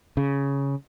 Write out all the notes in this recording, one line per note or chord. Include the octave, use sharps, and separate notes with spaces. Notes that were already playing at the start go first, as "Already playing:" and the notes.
C#3